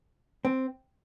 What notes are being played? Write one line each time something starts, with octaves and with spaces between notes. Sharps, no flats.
C4